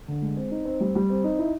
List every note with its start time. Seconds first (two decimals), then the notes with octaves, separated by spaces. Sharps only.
0.08 D3
0.22 G#3
0.37 C4
0.51 D#4
0.65 C4
0.80 G3
0.95 G3
1.10 C4
1.24 D#4
1.39 E4